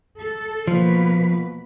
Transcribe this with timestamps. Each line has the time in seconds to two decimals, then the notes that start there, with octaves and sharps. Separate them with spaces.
0.18 A4
0.67 B2 F3 A#3 B4